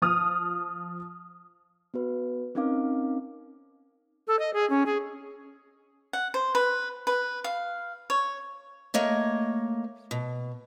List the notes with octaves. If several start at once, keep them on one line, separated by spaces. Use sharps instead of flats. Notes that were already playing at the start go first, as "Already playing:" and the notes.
F3 D#6 F6
B3 F#4 B4
C4 C#4 D#4 A#4 F5 D6
A4
D#5
G#4
C#4
G#4
F#5
C5
B4
B4
F5
C#5
A3 A#3 C#5 D#5
B2